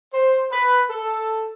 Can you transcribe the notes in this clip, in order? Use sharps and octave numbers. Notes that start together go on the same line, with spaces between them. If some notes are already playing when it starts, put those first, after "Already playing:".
C5
B4
A4